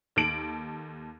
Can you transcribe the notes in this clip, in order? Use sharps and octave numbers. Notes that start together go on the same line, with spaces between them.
D#2 A4 D7 F#7